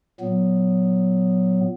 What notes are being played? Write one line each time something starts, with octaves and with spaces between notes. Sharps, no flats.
A#2 F#3 B3